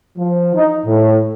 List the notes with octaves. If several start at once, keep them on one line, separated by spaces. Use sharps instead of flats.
F3
D#4
A2